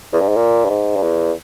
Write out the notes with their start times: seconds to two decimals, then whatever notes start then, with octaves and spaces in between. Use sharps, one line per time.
0.13 E2
0.21 G2
0.29 G#2
0.36 A#2
0.65 G2
0.70 G#2
0.96 G2
1.03 E2